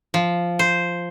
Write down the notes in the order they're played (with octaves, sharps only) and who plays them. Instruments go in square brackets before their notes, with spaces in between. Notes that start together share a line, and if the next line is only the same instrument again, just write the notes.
[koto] F3
C5